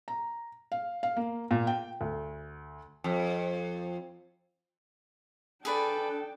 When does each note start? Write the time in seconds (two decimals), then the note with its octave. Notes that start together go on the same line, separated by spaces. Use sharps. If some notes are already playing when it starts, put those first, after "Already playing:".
0.08 A#5
0.72 F5
1.03 F5
1.17 A#3
1.51 A#2
1.67 G5
2.01 D2
3.04 F2
5.65 D4 G#4 A4 B4 D5 G5